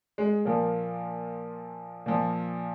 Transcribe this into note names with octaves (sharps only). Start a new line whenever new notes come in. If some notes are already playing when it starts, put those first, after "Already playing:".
G#3
A#2 F3 A#3
A#2 F3